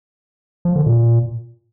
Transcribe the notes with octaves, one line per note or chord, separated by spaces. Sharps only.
F3
D3
A#2